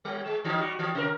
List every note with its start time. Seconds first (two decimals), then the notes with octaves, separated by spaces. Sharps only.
0.05 G3
0.26 G#3
0.44 E3 D#4
0.59 G3 F#4
0.79 E3
0.95 C3 A#4